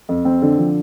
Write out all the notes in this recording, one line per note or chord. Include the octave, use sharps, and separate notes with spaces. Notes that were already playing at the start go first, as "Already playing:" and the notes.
F2
C4
D3
F3